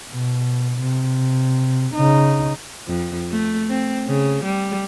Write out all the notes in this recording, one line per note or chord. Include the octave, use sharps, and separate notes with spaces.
B2
C3
C#3 D#4
F2
A3
C4
C#3
G3